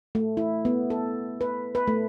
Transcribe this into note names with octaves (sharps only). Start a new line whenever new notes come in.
A3
E4
B3
A4
B4
B4
A3